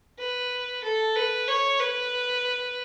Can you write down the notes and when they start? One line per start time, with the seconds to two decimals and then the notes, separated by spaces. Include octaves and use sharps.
0.19 B4
0.84 A4
1.16 B4
1.48 C#5
1.80 B4